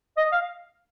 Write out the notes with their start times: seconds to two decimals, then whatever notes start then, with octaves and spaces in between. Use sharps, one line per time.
0.17 D#5
0.32 F5